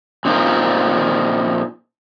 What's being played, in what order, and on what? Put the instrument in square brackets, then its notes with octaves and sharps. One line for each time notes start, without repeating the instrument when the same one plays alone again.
[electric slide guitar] A#2 C4 D#4 F4 A#4